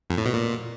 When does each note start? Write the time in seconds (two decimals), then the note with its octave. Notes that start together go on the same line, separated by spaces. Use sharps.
0.10 F2
0.18 A2
0.26 B2
0.34 A#2